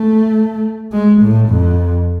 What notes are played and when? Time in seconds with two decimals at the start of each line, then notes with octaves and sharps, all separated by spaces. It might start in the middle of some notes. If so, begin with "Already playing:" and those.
Already playing: A3
0.92 G#3
1.21 A2
1.49 F2